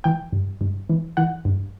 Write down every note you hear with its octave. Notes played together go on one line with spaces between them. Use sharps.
E3 G5
G2
G2
E3
E3 F#5
G2